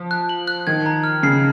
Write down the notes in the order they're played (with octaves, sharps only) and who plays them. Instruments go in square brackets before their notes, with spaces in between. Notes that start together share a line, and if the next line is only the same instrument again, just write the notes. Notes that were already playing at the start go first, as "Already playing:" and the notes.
Already playing: [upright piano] F3
[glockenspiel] F#6
F#7
F#6
[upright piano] D#3 [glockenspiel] G#6
[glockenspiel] A#5
F6
[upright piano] C#3 [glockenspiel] C7